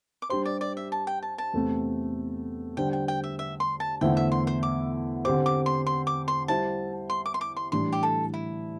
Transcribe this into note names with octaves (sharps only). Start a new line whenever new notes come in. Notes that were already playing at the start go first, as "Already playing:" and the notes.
D6
G3 D4 G4 C5 C6
D5
D5
E5
A5
G5
A5
A5
E2 C3 A3 C4
D3 G3 D4 C5 G5
G5
G5
E5
E5
C6
A5
E2 D3 A3 E4 C5 G5
E5
C6
C5
D6
D3 C4 G4 C5 D6
D6
C6
C6
D6
C6
G3 E4 C5 A5
C6
D6
C6
D6
C6
A2 E3 G3 D4 C6
G4
A4
E4